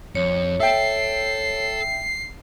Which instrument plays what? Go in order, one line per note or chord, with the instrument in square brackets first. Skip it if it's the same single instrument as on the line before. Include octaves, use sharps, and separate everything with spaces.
[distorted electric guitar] F2 [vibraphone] C#5
[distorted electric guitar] A4 [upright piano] E5 G5 [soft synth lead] C7